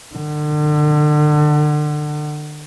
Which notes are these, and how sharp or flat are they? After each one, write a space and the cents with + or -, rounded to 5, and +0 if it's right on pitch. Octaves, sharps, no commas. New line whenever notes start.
D3 +35